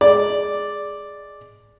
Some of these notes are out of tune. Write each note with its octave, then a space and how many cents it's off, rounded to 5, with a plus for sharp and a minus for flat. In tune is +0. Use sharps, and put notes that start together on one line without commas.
G#3 +0 D5 +0